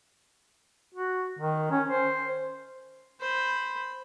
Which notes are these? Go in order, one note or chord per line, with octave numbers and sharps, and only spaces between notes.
F#4
D#3
C#4
C5
C5 B5